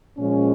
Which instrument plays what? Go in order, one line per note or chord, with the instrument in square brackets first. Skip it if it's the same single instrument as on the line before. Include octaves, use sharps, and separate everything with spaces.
[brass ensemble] A#2 F3 G#3 C#4